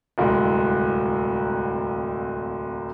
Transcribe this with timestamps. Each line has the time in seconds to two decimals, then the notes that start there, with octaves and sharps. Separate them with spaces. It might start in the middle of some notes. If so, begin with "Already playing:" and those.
0.18 D1 C2 G#3